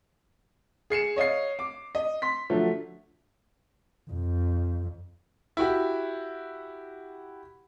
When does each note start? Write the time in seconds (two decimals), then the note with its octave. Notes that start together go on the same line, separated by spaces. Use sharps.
0.90 G#4 C7 C#7 E7
1.16 C#5 D#5 F5 C7
1.59 D6
1.95 D#5
2.22 C6 B6
2.50 D3 F3 F#3 A3
4.10 F2
5.57 E4 F#4 G4